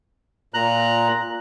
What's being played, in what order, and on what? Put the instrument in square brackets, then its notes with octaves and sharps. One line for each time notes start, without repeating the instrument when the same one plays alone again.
[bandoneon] A#2 A#5 F#6